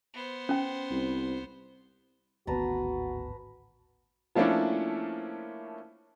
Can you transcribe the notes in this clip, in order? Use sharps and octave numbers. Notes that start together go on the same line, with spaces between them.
B3 C5
C#4 G5
C2
D1 G#1 B3 F#4 B4 A5 A#5
F3 A3 A#3 C#4 D4 E4